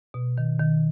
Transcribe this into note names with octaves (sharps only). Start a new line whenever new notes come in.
B2
D#3
D#3